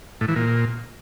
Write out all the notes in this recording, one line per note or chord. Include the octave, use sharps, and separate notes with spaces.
A2
E3
A#2